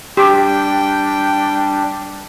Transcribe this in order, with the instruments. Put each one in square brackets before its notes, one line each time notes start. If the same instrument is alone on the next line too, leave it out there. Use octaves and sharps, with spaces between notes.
[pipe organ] G3 D4 [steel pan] G4 [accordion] G5